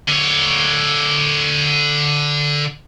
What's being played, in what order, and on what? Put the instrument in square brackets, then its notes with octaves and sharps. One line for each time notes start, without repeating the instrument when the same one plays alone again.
[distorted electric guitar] D3 C#5